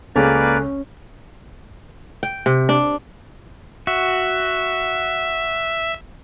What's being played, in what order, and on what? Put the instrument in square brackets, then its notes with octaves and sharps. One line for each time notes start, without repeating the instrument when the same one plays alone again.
[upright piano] C#2 [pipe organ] A#3 B4 D5 [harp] C#4 [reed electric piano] A4 C#5 G#5
[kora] G5
C3
D4
[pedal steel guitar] F#4 [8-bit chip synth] E5